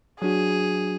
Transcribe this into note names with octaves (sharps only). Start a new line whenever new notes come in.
F#3 D4 F#4 G#4